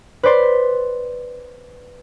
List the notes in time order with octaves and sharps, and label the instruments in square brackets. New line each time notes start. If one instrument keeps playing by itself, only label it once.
[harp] B4 C5 D5 C6